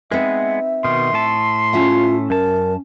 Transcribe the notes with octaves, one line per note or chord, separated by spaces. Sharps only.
G#3 B3 C4 D#4 B4 E5
B2 D#3 C6
A2 A3 A5
C#4 F4 E5 F#5
F#2 A#4 A5